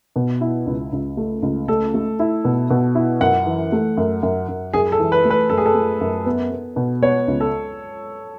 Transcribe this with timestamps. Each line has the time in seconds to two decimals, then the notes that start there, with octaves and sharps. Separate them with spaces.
0.16 B2
0.41 E4
0.66 C#2
0.92 C#2
1.17 A3
1.42 C#2
1.68 A3 A4
1.94 A3
2.19 E4
2.45 B2
2.70 B2
2.95 E4
3.20 F#2 F#5
3.46 E3
3.72 A3
3.97 F#2
4.22 F#2
4.48 F#2
4.73 F#2 G#4
4.92 A4
4.99 E3
5.12 B4
5.25 A3
5.30 B4
5.50 F#2 A4
5.58 G#4
5.66 A4
5.75 A3
6.01 F#2
6.26 B3
6.51 B3
6.76 B2
7.03 B3 C#5
7.28 C#2
7.40 A4